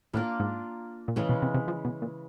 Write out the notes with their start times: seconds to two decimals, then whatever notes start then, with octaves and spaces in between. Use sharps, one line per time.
0.13 A2 A#3 D4 F4 A#4
0.40 G#2
1.08 A#2
1.16 A2 C#3 E3 G#3
1.29 B2
1.42 C3
1.54 C3
1.68 F3
1.85 B2
2.02 A#2